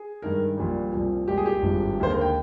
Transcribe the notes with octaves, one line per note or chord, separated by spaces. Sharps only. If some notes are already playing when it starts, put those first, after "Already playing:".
Already playing: G#4
G2 D#3 G#3 A#4
A#1 A#2 G3
C2 A#2 F3
C2 A#2 G#3 G4
G#4
G4
G#1 G2 F3 G#3
D#2 D3 G#3 C5
A#4
G5